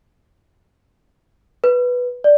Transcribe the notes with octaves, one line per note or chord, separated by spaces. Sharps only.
B4
D5